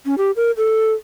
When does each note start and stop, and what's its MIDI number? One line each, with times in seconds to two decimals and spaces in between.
0.06 0.15 61
0.18 0.31 67
0.36 0.51 70
0.57 0.92 69